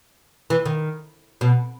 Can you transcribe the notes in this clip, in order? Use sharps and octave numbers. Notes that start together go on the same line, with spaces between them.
E3
D#3
B2